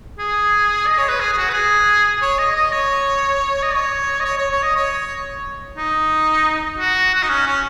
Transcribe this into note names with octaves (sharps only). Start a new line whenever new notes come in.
G#4
D#5
C#5
B4
G#4
G#4
F#4
B4
G#4
C#5
D#5
D#5
C#5
D#5
C#5
D#5
C#5
C#5
C#5
D#5
C#5
D#4
F#4
F#4
D#4
C#4
C#4